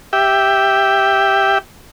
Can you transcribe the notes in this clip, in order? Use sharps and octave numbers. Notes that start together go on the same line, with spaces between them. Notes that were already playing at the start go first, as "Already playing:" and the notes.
G4 E5 G5